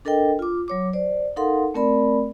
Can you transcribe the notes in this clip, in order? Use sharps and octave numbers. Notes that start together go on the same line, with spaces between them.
D4 A4 A#4 D#5 G5
F4 D6
F#3 C#5 D6
C5 D5
D#4 A4 A#4 F5 F#5 C6
A3 C4 A#4 D5 B5